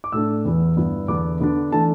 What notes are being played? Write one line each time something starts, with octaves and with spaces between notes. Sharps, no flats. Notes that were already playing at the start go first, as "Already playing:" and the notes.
D6
A2 A3 D4 E6
E2 E3 B3
G2 D3 B3 E4
E2 D3 B3 D4 D6
D3 B3 D4
E3 A3 D4 A5